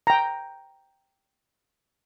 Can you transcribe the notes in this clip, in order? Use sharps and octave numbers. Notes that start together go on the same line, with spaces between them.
G5 A#5